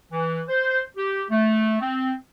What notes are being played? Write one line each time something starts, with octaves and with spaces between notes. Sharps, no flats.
E3
C5
G4
A3
C4